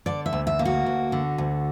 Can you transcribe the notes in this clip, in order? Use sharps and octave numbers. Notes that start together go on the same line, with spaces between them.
D3 D5
E5
D2
E5
A#3
F#4
D2
D3
D2